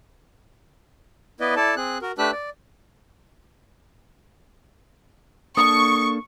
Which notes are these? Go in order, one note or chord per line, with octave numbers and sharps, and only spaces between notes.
B3 E4 B4 D5 D#5
E4 A4 D5 A5
C4 G#4 F#6
F#4 A#4
A3 D4 G4 B4 E6 F#6
D5
A#3 D4 A4 C#6 D#6